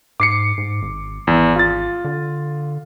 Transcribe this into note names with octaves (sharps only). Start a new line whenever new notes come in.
G#2 D6 C7 C#7
G#2
G#1
G#1 E2
F4 A6
D3